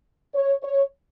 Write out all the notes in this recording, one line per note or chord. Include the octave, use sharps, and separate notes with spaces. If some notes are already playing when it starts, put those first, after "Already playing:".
C#5
C#5